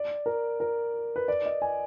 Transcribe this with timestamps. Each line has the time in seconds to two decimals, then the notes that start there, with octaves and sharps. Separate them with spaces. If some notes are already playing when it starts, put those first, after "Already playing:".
Already playing: D5
0.26 A#4
0.60 A#4
1.16 B4
1.28 D5
1.46 D#5
1.62 G#5